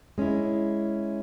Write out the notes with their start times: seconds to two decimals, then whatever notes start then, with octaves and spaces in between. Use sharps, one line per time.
0.18 G#3 C#4 E4